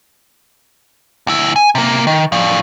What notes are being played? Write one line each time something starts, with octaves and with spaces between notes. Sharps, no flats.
D2 E4
G#5
C3 A#3
D#3
A2 F3